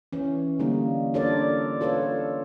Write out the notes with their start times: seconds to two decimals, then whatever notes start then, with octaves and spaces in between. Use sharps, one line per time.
0.13 E3 C#4
0.59 D3 G3 A#3 D#4
1.14 D4 F4 A4 A#4 C#5 D5
1.81 F4 A4 B4 C#5